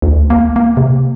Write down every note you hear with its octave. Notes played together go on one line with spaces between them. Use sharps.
D2
A#3
A#3
C3